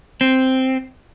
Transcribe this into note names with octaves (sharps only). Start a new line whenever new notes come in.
C4